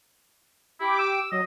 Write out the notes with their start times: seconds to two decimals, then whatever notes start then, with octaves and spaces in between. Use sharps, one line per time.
0.80 E4 G4 D6
0.99 E6
1.32 F#3 D#5